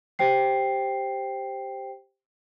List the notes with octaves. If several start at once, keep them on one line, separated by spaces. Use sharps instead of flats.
G4 C5 G5 C7